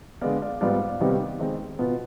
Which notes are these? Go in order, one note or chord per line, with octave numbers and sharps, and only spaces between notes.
D3 G#3 B3 D5 F5
D5 F5
G#2 G3 B3 F4 D5 F5
C3 D#3 G3 B3 D#4
D#3 G#3 C4 D#4
B2 B3 F4